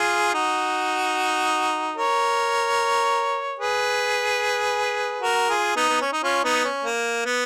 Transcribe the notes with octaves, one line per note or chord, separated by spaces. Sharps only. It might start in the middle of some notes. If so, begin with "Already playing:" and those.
Already playing: F4 G#4
D#4 F#4
A#4 C#5
G#4 B4
F#4 A#4
F4 G#4
B3 D#4
B3
C#4
D#4
C#4 F4
B3 D#4
C#4
A#3
B3